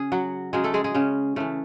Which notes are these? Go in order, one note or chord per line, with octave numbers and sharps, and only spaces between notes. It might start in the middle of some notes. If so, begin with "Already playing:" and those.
Already playing: C#3 G#4
F#3 F#4
C#3 F#3 G#3 G#4
A3 A4
G#3 G#4
G#3 G#4
C#3 C#4
C#3 E3 A3